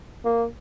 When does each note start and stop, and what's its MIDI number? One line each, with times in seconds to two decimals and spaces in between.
0.25 0.45 58